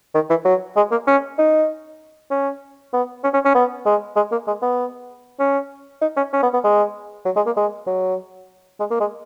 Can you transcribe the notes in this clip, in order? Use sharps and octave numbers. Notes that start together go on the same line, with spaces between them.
D#3
E3
F#3
G#3
A#3
C#4
D#4
C#4
B3
C#4
C#4
C#4
B3
G#3
G#3
A#3
G#3
B3
C#4
D#4
C#4
C#4
B3
B3
G#3
F#3
G#3
A#3
G#3
F#3
G#3
A#3
G#3